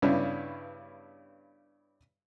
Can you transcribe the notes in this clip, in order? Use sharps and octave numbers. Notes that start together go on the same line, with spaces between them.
G2 C#3 B3 C#4 D4 E4